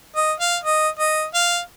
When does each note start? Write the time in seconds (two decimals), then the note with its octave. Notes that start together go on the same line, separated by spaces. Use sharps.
0.16 D#5
0.40 F5
0.64 D#5
0.99 D#5
1.34 F5